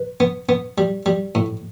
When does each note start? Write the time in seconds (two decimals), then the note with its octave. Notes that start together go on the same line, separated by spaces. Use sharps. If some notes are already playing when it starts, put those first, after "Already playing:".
Already playing: B4
0.20 B3
0.49 B3
0.78 G3
1.06 G3
1.35 A2